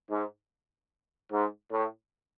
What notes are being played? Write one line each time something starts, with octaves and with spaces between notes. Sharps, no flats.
G#2
G#2
A2